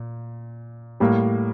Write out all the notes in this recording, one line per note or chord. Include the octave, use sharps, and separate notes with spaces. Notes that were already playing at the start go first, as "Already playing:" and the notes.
Already playing: A#2
A2 G3 A#3